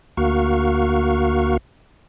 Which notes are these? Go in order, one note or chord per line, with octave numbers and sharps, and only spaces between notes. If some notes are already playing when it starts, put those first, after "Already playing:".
D2 A#3 F#4 F5 C#6